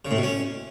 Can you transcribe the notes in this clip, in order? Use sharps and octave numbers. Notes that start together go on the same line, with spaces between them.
C#3
A2
B2
C#4